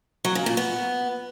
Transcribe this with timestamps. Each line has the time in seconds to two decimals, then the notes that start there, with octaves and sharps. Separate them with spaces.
0.25 F#3
0.35 C#3
0.46 A#2
0.57 B3